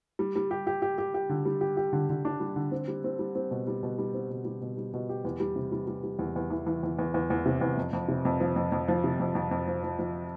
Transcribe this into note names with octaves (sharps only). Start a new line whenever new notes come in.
G3
G3
G4
G4
G4
G4
G4
D3
G3
G4
G4
D3
D3
D4
G3
D3
C4
G3
C4
G3
C4
B2
G3
B2
G3
C4
B2
G3
B2
G3
B2
G4
E2
G3
C3
G3
G3
G3
E2
E2
E3
E3
E2
E2
E2
E2
C3
E2
F2
F2
C3
F2
F3
F2
F2
F3
C3
F2
F2
F2
F3
F3
F3